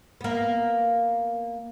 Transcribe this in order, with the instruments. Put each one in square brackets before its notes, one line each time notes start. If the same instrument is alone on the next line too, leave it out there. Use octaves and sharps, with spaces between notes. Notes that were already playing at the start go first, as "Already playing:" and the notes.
[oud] A#3 B3